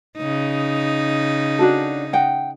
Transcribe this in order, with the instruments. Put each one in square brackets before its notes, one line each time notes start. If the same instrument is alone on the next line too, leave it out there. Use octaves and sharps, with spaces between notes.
[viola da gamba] C#3 D#4
[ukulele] D4 F#4 A4
F#5 G5